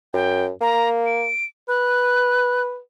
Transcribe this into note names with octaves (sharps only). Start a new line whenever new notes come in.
F#2 G5
A#3 A#5
D7
B4 F#6